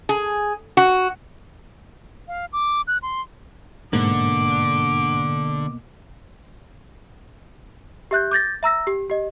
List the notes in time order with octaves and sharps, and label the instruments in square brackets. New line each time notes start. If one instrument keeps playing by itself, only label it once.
[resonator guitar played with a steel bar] G#4
F#4
[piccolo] F5
D6
F#6
C6
[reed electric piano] G#2 [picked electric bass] B2 A#3 [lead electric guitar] D3 [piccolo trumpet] D6
[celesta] G4 E5 F#6 G6
D6 G6 A6 A#6
E5 A#5 E6 A#6
G4
G4 D#5